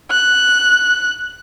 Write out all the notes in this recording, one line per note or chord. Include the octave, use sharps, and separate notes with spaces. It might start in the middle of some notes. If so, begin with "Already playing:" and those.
F#6